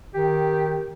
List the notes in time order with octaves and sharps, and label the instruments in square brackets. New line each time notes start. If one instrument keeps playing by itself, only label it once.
[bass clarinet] D#3 [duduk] G4